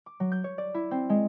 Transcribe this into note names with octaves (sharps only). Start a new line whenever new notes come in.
D6
F#3
G6
C#5
D5
E4
C4
G#3